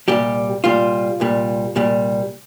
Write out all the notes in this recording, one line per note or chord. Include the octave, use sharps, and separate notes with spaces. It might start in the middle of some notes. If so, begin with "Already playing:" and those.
C2 A#2 G3 G4
C2 A#2 G3 F4
C2 A#2 G3
C2 A#2 G3